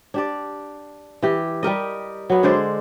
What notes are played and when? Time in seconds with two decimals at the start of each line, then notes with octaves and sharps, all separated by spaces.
0.14 D4 G4 D5
1.22 E3 G4
1.63 G3 G4 A#4 D#5
2.30 F#3 B3
2.43 D3 G#3 C5 D5